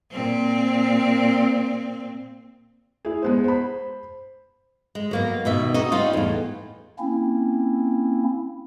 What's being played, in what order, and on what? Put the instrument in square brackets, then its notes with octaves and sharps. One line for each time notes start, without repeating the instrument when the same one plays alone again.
[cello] A#2 C4
[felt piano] E4 G#4
G#3 B3 C5
C5 B5
[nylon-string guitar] G#3
F#3 A#3 B3
D#2 B2 E5
D#4 F#4 D#5
G3 D#4 F4
E2 A2
[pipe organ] A#3 C4 C#4 E4